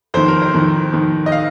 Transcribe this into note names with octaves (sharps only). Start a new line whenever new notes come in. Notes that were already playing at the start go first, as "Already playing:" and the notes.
F2 D#3 C5
A#4
C5
F2 D#3
F2 D#3
D#5
F5